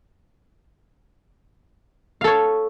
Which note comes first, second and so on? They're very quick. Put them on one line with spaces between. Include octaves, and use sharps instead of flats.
F5 A4 C#5